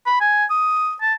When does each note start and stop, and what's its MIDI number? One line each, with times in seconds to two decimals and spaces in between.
0.06 0.16 83
0.21 0.45 80
0.50 0.94 87
1.01 1.14 81